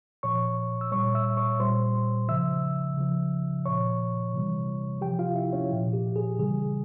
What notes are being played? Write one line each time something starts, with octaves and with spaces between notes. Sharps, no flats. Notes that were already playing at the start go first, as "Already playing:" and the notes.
A#2 F3 C#5 C#6
E6
A#2 G3 C#5 C#6
E5 E6
C#5 C#6
A#2 G3 C5 C6
C#3 F3 E5 E6
C#3 F3
A#2 F3 C#5 C#6
C3 E3 G3
C3 F3 G4 G5
F4 F5
E4 E5
C#4 C#5
A#2 F3
G4
G#4
C#3 E3 G3 G#4